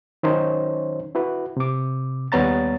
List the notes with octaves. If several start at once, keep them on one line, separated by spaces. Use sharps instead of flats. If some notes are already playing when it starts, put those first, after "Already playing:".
D#3 F#3 C#4 D#4 C5 C#5
E4 F#4 B4
C3 D6
D#2 G3 B3 C#5 A#5 A6